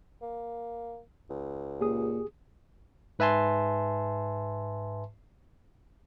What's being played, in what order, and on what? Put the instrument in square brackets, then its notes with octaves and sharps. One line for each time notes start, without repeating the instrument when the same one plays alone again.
[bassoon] A#3
C#2
[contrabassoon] A#2 [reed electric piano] G4 G#4 D#6
[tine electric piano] G#2 B4 E5 G#5 A5 C6